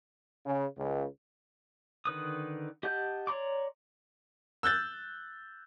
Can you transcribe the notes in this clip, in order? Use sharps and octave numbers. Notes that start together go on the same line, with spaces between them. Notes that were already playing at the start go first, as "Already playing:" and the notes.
C#3
C#2
D3 D#3 B4 D#6
G4 D#5 F#5 A5 G6
C#5 D5 A#5 C6 D6
E6 F#6 G6 A6